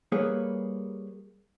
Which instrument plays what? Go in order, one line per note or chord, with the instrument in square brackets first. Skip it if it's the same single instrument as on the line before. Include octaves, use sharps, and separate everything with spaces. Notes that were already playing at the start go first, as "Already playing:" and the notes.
[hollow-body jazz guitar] G3 A#3 G#4 B4 C#5